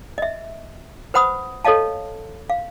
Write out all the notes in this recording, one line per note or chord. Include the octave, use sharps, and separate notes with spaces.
D#5 E5
B4 C5 F#5 B5 D#6
A4 C#5 D#5 F5 A5
F5